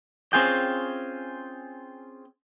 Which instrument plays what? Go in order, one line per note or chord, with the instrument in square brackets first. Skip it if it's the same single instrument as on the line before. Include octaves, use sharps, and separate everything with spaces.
[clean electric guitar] C4 C#4 F4 G#4 G5